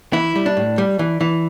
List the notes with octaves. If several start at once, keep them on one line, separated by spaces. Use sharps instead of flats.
E3 E4
G3
D4
A2
G3
E3
E3